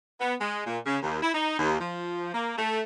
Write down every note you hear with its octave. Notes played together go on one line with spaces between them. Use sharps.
B3
G#3
A#2
C#3
D#2
E4
D#4
D#2
F3
A#3
A3